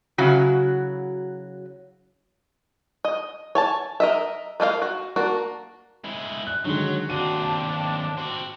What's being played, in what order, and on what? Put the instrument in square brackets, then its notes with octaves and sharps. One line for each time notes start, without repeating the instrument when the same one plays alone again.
[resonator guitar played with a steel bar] C#3 F#3 E4 F#4
[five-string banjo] D#5
C#5 G#5 A5
A#4 D#5 E5
G#3 A#3 A#4 F5
F#4
A#3 D4 F#4
[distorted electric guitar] G#3 E4
[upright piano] F#6
[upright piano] D3 D#3 G#3 [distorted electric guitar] F#3 [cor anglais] C#5
[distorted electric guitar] D#2 C4 [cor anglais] D4 [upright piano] F#4 D#7
[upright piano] A5
[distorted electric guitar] C4 F#4